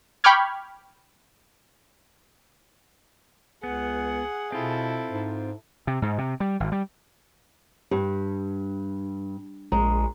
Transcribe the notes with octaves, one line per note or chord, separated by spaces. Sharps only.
G5 B5 C#6 D6 F6 G#6
C#2 B3 G#4 F#5
B2 C4 E4 F4 A4
G#2
C3
G#2
C3
G3
G#1
G3
G2 G4
A#1 G#3 A#5